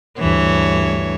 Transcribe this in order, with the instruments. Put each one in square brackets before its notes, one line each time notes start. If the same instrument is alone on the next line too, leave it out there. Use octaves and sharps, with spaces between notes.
[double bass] D2 G2 [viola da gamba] E3 C#5